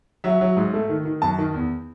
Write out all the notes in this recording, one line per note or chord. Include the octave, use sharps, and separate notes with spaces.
F#3 E5
F#3
G#2
A3
D#3
D#3
F#2 A5
D#3
E2